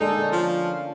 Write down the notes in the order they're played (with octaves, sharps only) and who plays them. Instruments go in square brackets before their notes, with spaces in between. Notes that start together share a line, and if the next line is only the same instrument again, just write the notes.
[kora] D3 G#3 A#3 [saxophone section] D#4 [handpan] A4
[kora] D3 C#4
[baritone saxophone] F3 [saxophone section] F4